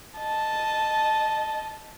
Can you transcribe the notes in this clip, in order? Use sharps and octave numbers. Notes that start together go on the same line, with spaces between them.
D#5 A5